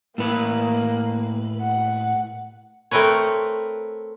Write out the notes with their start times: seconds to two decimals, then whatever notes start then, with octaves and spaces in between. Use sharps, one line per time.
0.18 A2 A#3 B4
1.61 F#5
2.91 A3 C4 A#4 B4 C#5